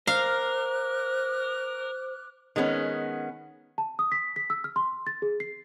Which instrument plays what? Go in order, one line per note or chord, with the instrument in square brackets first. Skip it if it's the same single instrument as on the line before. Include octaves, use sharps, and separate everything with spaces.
[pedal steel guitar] A#4 [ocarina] C5 [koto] F5 [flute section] D6 F6 F#6
[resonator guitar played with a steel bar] D#3 G#3 B3 C#4
[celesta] A5
D#6
B6
B6
E6
F6
C6
A6
G#4
C7